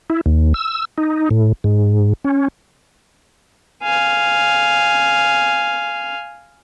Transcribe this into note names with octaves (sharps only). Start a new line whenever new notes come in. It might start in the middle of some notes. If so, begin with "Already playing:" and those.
E4
D#2
E6
D#4
A2
G#2
C#4
F5 G#5